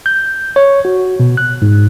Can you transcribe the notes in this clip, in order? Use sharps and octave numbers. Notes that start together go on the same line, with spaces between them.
G6
C#5
F#4
B2
F#6
G#2